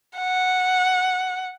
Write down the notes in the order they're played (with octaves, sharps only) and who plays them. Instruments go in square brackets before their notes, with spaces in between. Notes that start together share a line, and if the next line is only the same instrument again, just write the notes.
[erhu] F#5